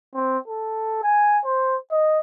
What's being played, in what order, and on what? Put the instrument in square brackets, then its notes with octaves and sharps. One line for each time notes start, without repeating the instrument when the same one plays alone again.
[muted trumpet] C4
A4
G#5
C5
D#5